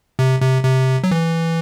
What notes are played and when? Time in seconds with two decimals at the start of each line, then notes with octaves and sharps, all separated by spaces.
0.19 C3
0.42 C3
0.64 C3
1.04 F#3
1.11 E3